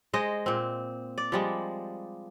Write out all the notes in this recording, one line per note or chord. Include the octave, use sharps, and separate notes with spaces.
G#3 C5 D#5
A#2 C4
D5
F3 G3 G#3